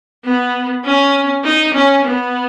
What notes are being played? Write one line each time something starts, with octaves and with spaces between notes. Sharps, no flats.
B3
C#4
D#4
C#4
B3